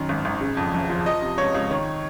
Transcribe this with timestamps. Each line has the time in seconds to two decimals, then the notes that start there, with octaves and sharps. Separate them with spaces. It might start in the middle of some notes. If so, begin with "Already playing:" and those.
Already playing: F#2 D#3
0.09 G#1
0.25 G#1
0.41 C#3
0.57 F2
0.74 F#1
0.89 F3
1.06 F3 D#5
1.22 C3
1.38 C#2 C#5
1.54 C#2
1.71 D#3 C#5